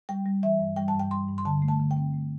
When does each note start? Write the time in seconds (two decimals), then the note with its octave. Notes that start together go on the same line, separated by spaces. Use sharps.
0.09 G3 G5
0.26 G3
0.43 E3 E5
0.60 G2
0.76 G3 G5
0.88 A5
0.94 G2
1.00 G5
1.11 G3 C6
1.28 G2
1.38 C6
1.45 D3 A5
1.62 A3
1.68 A5
1.80 D3
1.91 G5
1.97 C4
2.14 A3